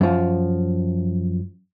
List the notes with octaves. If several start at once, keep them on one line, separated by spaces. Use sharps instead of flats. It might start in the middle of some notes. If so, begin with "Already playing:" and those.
F#2 F3